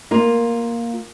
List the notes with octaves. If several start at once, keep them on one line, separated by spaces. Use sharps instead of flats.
A#3 F4